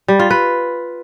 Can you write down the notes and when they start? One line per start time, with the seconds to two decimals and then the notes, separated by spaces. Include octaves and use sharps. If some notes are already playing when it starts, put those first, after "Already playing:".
0.08 G3
0.19 F4
0.30 B4